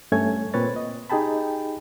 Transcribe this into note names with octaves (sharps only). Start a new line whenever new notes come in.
G2 A3 C#4 C#5 G#5 G#6
A#2 C4 B4 C#5 A6
D#5
D#4 G4 G#4 G5 A5 B5